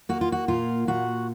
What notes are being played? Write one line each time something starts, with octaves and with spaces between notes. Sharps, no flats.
A#3 F#4
F4
F#4
A#2 F4
A#2 F#4